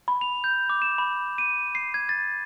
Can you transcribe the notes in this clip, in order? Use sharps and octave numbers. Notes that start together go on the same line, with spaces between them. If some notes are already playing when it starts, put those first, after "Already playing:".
B5
F7
G6
D6
E7
B5
D#7
C7
G#6
A6